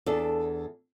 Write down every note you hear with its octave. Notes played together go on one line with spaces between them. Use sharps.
E2 D4 A4